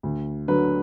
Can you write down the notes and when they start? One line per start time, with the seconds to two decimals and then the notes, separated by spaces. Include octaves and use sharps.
0.03 D2
0.48 D3 F#3 B4